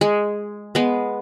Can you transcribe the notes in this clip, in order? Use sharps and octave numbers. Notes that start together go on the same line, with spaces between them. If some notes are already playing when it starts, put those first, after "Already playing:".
G#3
G#3 B3